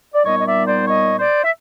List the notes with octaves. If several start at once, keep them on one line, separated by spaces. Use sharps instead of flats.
D5
A#2 G3 B3 D#4 C#5 D#5
D#5
D5 E5
C5 D5
C#5 D#5
C5 D5
E5